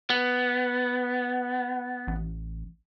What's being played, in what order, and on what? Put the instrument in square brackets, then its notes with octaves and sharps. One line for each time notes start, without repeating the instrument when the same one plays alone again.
[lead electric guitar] B3
[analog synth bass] A1